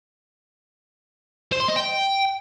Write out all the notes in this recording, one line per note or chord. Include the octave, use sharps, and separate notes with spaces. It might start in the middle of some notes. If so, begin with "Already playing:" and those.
C5
C6
D#5
G5